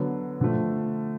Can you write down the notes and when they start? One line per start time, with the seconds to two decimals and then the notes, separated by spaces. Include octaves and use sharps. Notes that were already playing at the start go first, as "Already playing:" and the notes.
Already playing: D3 F#3 B3
0.41 D3 F3 A3